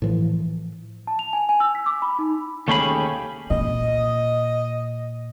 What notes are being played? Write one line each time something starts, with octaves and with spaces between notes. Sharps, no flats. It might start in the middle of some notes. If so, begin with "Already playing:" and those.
A2 E3 F3
A5
F7
G#5
G#5
E6
B6
D6
B5
D#4
D#2 A3 C#4 G4 G#4 B5
A#2 D#5